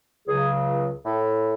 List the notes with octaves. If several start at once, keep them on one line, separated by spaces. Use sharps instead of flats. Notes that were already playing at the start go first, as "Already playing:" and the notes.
C#2 C#3 F#3 G#4
A2